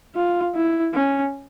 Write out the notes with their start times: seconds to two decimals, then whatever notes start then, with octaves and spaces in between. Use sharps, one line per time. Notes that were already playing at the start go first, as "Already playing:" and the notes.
0.15 F4
0.55 E4
0.94 C#4